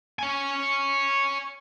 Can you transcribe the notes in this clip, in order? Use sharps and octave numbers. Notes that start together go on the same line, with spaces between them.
C#5 G#5